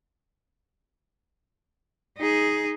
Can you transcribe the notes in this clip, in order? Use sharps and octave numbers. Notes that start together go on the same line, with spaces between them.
D#4 G#4